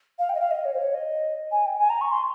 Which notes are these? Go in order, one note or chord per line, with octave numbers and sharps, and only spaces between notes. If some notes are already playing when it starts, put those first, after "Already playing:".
F5
G5
D#5
F5
D#5
C#5
C5
C#5
D#5
G#5
G5
G#5
A#5
C#6
C6